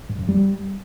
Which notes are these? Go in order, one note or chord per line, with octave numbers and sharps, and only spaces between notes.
G2
F#2
G3